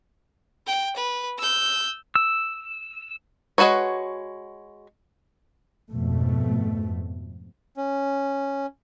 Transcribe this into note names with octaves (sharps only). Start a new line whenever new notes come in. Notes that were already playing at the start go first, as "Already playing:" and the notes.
G5
B4
E6 G6
E6
G#3 C4 F#4 B4 C#5
F2 G#2 B2 A3
C#4